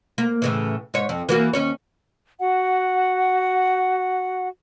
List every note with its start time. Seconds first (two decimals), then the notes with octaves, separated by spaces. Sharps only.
0.18 A#3
0.42 A2 C#3 E3
0.94 G#2 C#5
1.09 F2
1.29 E3 A#3 F#4
1.53 D#2 C#4 C#5
2.40 F#4 F#5